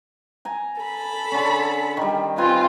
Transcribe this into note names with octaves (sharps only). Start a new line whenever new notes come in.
G#5 A#5
A4 B5
D3 C#4
D#3 G3
C4 F4 B4 G#5